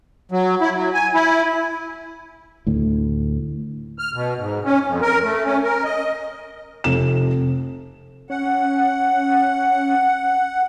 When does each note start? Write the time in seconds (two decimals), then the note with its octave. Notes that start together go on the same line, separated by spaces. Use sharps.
0.32 F#3
0.61 E4
0.74 F#3
0.94 G#5
1.14 E4
2.67 D2 A2
3.99 F6
4.14 B2
4.38 G#2
4.64 C#4
4.87 F2
5.01 A#4
5.23 A3
5.45 C#4
5.63 A#4
5.84 D#5
6.84 F1 E7
8.30 C#4 F#5